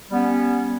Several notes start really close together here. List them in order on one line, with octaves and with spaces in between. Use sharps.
G3 B3 C#4